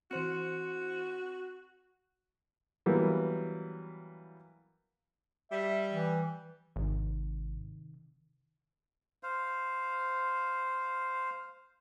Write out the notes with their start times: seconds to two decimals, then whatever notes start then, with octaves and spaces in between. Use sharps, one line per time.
0.11 E3 C4 F#4 C5 C6 C#7
2.86 E3 F#3 G3 A#3 B3
5.51 G3 E5
5.91 E3
6.76 G#1 C3 D#3
9.23 C5 F5